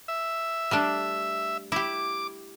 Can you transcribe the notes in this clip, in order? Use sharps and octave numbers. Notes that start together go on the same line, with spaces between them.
E5
G3 A3 D4
E4 G4 D6